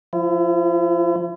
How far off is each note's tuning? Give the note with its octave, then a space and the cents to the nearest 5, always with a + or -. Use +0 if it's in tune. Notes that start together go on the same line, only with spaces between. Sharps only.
F3 +0 E4 +40